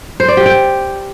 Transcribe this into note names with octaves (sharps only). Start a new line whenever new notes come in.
C5
D5
G4
G5